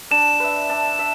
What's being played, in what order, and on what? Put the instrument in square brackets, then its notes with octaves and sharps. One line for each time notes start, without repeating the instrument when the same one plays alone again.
[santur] D4 [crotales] E7
[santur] B4 E5
D4
E5